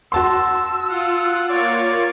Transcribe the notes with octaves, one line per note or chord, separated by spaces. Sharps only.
F#4 A5 C6 E6
F4 F#5
A#3 F4 C#5 D5